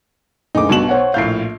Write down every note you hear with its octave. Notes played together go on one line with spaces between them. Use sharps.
F#1 D2 D#4 D6
B1 G2 B2 F#4 E7 F#7
C5 C#5 F#5
A#1 A2 F5 G6 C7